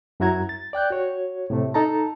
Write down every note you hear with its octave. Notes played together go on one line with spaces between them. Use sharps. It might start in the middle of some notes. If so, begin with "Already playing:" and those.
F#2 F#3 E4 F#4 A#5 G#6
A6
D5 G5 F#6 G6
F#4 C#5
A2 C3 A3
D#4 A4 A5 A#5